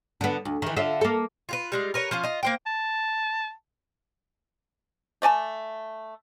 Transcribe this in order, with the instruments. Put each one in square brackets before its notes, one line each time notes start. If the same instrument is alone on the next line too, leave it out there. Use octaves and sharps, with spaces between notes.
[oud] D3 B3
D2
D#3 E3
D3 F4 E5
A#3 A4
[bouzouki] F4 G4 B4
G3 G#3 F4
A#4 B4 C#5
F3 C#4 F4
F4 D#5
A#3 C5 G5
[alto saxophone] A5
[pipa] A3 D5 G#5 A5